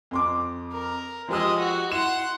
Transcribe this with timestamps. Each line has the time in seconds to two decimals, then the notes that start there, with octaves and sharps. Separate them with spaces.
0.11 F2 C6 D6
0.72 A#4
1.28 F3 G#3 G4 D#5 E6
1.59 F#4
1.92 E4 F#5 C6 E7